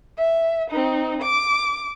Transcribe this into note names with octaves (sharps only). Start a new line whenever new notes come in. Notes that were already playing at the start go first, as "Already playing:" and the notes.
E5
C4 D#4
D6